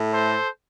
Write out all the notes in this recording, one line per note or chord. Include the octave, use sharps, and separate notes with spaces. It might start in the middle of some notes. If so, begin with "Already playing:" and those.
Already playing: A2 A3
A4 C5